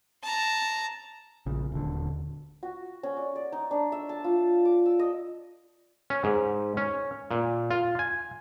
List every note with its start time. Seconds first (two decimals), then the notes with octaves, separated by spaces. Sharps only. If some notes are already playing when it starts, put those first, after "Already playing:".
0.23 A5 A#5
1.46 A#1 C#3
1.72 D#1 D3
2.63 F#4
3.03 C#4
3.17 D5
3.35 D5
3.52 D#4
3.71 D4
3.92 E5
4.09 A5
4.24 F4
4.65 D6
4.86 E6
4.99 D#5
6.10 C#4
6.24 G#2
6.77 C#4
7.31 A#2
7.70 F4
7.99 G#5